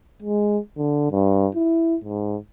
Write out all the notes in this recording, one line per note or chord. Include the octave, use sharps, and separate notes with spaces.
G#3
D3
G2
E4
G#2